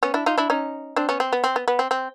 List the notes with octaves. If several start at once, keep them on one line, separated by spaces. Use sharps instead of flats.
B3 C#4
D4 E4
D#4 F4
D4 E4
C#4 D#4
C4 D4
B3 C#4
C4
B3
C4
B3
B3
C4
C4